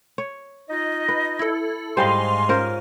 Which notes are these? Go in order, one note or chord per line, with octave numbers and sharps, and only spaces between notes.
C#5
D#4 F4 D#5
B4
E4 A4
G#2 G3 C5 D#5 F5 G#5 C6
C#4 F4 A#4 C5